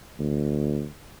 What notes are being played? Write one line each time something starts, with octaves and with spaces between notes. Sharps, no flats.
D2